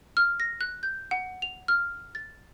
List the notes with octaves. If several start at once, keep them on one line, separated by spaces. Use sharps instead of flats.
F6
A#6
F#6
G6
F#5
F7
F6
A6